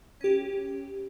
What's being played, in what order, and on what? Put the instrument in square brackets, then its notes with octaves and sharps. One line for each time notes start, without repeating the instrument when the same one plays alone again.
[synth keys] C#4 G4